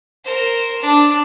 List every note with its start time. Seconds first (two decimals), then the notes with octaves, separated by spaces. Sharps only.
0.25 A#4 C5
0.81 D4